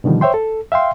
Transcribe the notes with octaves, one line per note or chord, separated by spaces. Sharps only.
B2 D3 D#3 F3 G3
C5 C#5 E5 G5 C6
A4
E5 F5 G5 C6